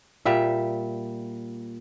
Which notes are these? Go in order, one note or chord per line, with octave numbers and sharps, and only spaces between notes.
A#2 G3 E5